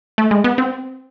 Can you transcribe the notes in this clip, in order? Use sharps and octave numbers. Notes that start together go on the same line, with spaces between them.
A3
G#3
B3
C4